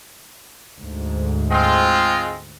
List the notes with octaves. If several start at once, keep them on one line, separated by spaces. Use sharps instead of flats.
D2 G#2
G#3 C4 F4